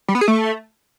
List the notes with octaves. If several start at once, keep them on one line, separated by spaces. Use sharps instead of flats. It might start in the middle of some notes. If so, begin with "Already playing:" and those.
G3
B3
G#4
A3